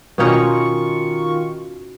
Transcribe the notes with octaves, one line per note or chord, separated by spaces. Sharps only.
B2 D#3 C#4 D#4 F4 C#6